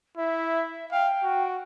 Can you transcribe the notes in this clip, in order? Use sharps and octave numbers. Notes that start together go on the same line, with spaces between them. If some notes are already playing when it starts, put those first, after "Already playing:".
E4 E5
F5 G5
F#4